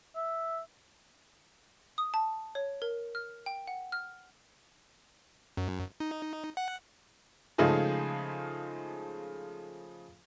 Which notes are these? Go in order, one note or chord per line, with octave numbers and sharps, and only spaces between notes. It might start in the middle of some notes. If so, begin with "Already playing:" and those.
E5
D#6
A5
C#5
A#4
F6
G5
F#5
F6
F#2
D#4
F#5
C#3 F3 G#3 A3 D#4 G#4